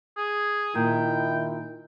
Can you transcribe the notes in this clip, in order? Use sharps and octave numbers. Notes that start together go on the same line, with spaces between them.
G#4
A#2 D#3 E4 G5